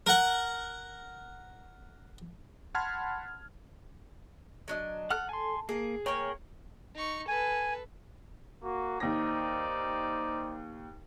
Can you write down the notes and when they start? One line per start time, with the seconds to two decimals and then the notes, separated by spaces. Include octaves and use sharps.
0.07 A#4 F#5
2.75 F#5 A5 B5 C6 F6 G#6
4.68 F#3 D4 D#5
5.10 A4 F#5 F6 F#6
5.29 G#5 C6
5.69 A#3 G#4
6.06 A#3 G#4 A#4 C#5 G5
6.95 D#4 C#6
7.28 A4 B4 G#5
8.63 A#3 F#4
9.00 D#2 D#4 C5 D5 A#6